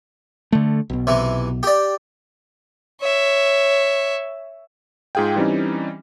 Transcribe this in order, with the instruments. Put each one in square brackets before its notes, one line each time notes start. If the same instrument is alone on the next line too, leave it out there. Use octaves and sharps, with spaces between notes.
[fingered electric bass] D3 A3
B1 B2
[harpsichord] C3 E3
G4 D5
[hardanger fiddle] C#5 E5
[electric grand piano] G#2 F4 G#4 F5 G5
E3 G3 C4 C#4 D#4